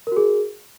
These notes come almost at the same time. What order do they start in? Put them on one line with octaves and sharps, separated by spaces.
A#4 F#4 G#4